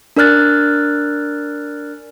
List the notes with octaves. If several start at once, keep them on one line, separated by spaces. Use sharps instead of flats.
D4 A#4 D5 F6 F#6 A6